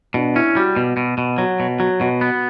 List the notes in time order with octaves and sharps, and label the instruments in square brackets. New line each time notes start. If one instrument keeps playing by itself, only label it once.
[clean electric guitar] B2 [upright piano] D4
[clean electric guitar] C#4 [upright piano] E4
[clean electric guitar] G3 [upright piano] F#4
[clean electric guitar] B2
B2
B2
[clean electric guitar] F#3 [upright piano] F#4
[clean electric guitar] B2
[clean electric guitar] F#3 [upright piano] F#4
[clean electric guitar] B2 [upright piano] F#4
[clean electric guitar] B3